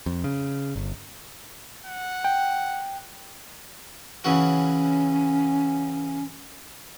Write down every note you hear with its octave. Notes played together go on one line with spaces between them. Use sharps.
F2
C#3
G1
F#5
G5
C#3 E3 C#4 F#4